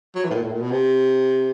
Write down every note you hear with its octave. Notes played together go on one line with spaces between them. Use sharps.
F#3
E3
A2
A#2
A2
A#2
B2
C3